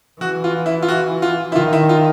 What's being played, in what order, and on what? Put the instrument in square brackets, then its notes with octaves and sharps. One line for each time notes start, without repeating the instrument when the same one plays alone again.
[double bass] E3 [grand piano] F#4
[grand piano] F4
E4
F4
F#4
F4
E4
[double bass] D#3 [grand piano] F4
[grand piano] E4
F4